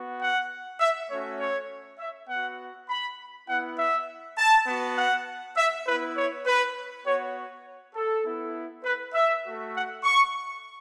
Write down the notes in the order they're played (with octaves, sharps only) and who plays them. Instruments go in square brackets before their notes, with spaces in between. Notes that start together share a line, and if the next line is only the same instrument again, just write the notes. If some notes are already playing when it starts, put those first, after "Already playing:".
Already playing: [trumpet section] B3 F#4
F#5
E5
A3 C#4 F#4 C#5
C#5
E5
B3 F#4 F#5
B5
B3 E4 F#5
E5
A5
B3 F#4
F#5
E5
B3 E4 B4
C#5
B4
B3 F#4 C#5
A4
B3 E4
B4
E5
A3 F#4
F#5
C#6